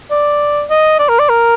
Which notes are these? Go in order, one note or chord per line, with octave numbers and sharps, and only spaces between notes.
D5
D#5
D5
A#4
D5
A#4